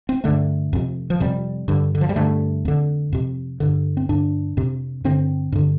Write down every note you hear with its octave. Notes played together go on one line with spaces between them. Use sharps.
C4
G2 D3 A3
F2 C3
F3
F2 C3 G3
G2 D3
D3
F3
G3
G2 D3 A3
F2 D3
F2 C3
G2 D3
C4
G2 D3 D4
F2 C3
G2 D3 C4
G2 D3